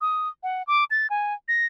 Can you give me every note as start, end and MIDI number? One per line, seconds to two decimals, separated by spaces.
0.01 0.29 87
0.43 0.63 78
0.67 0.84 86
0.91 1.07 93
1.10 1.34 80
1.48 1.66 94